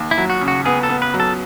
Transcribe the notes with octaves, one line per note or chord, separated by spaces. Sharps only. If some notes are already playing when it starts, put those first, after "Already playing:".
Already playing: D#2
E4
F#3
F#4
C#3
F#4
B3 G#4
A4
B3
B4
F#3
A4